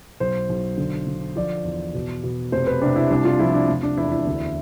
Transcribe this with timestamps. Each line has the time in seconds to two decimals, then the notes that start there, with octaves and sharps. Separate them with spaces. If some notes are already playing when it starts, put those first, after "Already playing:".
0.20 B1 C5
0.49 B1
0.78 D3
1.07 D3
1.36 F3 D5
1.65 E2
1.94 B2
2.24 B2
2.52 F1 C5
2.67 B4
2.82 C3 D4
2.96 E4
3.10 C2 D4
3.25 F4
3.40 F3 E4
3.54 D4
3.69 F1
3.83 D4
3.97 E2 E4
4.12 E4
4.27 D2